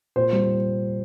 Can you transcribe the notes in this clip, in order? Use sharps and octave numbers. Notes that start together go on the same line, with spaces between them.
A#2 C5
G3